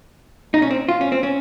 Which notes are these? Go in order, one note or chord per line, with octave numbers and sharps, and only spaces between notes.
D#4
C#4
C4
F4
C#4
C4
C#4